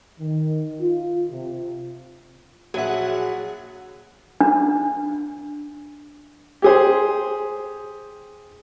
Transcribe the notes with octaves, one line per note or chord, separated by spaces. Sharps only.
D#3
F4
C3
A#1 F#3 G#4 E5 F#5
D4
G4 G#4 C5